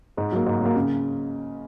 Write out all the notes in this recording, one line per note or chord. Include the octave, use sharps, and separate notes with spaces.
G#2
F#3 A#3
G#2
F#3 A#3
C#3